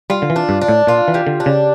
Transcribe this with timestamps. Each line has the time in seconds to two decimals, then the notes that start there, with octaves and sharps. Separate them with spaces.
0.10 G3 F4
0.22 D3
0.30 E3
0.36 D4
0.49 G2
0.61 D4
0.68 A2
0.87 A#2 F4
1.08 E3
1.14 G3
1.27 D3
1.40 D4
1.46 C#3